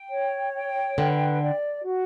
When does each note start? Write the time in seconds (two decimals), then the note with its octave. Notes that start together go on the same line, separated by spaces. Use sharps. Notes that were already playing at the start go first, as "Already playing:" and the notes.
Already playing: G5
0.11 C#5
0.54 G5
0.98 D3 B4
1.41 D5
1.85 F#4